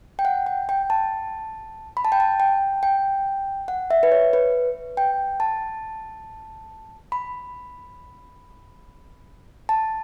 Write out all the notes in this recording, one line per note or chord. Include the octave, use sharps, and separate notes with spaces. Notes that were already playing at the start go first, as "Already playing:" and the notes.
G5
F#5
G5
G5
A5
B5
A5
G5
A5
G5
G5
F#5
E5
B4
C#5
B4
G5
A5
B5
A5